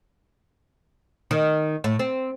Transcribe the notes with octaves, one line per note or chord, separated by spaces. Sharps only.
D#3
A2
C4